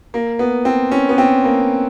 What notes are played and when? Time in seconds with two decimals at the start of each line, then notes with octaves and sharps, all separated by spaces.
0.14 A#3
0.39 B3
0.65 C4
0.92 C#4
1.09 B3
1.18 C4
1.44 A#3